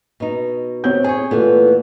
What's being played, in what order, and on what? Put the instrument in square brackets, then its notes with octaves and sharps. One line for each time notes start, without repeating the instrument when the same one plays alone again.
[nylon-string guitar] B2 D#4
[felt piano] C4 C#5 G6
[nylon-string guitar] G#4 C#5 [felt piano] G#5
[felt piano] A#2 A3 [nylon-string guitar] E3 B3